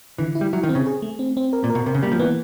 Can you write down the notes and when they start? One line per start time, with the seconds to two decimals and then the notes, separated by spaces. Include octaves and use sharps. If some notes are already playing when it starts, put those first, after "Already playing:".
0.18 D3 E3
0.35 E4
0.41 G3
0.53 F#3 E4
0.63 D#3
0.69 C4
0.75 C#3
0.87 G#4
1.02 A3
1.19 C4
1.37 C4
1.53 A#4
1.64 A#2
1.70 A#4
1.75 B2
1.86 C3 A#4
1.95 C#3
2.03 G3 A#3
2.12 F3
2.19 E3 B3